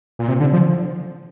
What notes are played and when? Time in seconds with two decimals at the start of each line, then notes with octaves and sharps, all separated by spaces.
0.19 A#2
0.28 C3
0.40 D3
0.53 F3